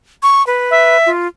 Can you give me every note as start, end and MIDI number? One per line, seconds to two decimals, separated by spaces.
0.23 0.45 85
0.47 0.97 71
0.71 1.09 76
1.06 1.27 65